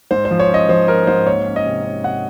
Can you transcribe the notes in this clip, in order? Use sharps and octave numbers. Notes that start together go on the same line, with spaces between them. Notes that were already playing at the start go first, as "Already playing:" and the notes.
G#2 C5
C5
F3
C#5
C#4 D#5
F3 C5
C#4 A#4
G#2 C5
A#3 C#5
C#4
D#5
C3
C#4
C3 F#5